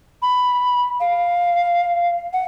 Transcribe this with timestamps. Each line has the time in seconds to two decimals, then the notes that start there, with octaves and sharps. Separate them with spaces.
0.22 B5
1.00 F5
2.33 F#5